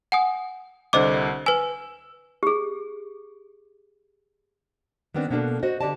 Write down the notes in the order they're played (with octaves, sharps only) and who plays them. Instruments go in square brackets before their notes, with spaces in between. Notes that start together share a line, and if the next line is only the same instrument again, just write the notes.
[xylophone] F#5 G#5 D#6
[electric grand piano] C2 D3 [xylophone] C5 D#5 D6
[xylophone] B4 G#5 [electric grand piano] E6
[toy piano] G4 G#4
[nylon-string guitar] D#3 G3 B3 C4 D4
B2 A#3 B3 D4 A4
F#4 C5 D#5
D3 G4 D5 D#5 A5